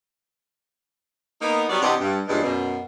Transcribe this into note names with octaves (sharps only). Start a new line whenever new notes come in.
A#3 B3 D#4
F#3 G3 B3 C#5 D5
C3 E3 D4 G4 D#5 F#5
G2
G2 A#2 C#3 E3 G#3 D5
F#2 B2